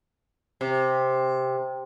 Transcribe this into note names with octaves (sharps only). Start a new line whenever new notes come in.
C3